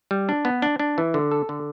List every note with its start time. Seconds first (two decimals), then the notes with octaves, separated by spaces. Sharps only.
0.11 G3
0.29 D4
0.45 B3
0.62 D4
0.80 D4
0.98 E3
1.14 D3
1.31 A4
1.49 D3